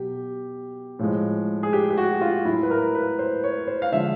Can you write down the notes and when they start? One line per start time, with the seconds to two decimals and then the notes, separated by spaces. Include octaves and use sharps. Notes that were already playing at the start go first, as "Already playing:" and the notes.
Already playing: B2 F#3 G4
0.99 A2 F3 G#3
1.63 G#4
1.73 G4
1.91 G4
1.97 F#4
2.21 F4
2.45 A2 F#3 E4
2.63 B4
2.71 A#4
2.95 B4
3.19 C5
3.44 C#5
3.67 C5
3.82 F5
3.92 D3 F3 G#3 E5